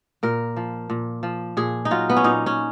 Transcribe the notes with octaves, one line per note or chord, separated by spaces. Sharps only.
A#2 A#4
F3
A#2
F3
A#2 G#4
D#4
F#3 F4
B3
C#4
A#2 D#4
C#4